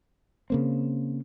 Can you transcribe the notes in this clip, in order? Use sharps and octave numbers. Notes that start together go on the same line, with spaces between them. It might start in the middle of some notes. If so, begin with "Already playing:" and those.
C#3 A#3 C4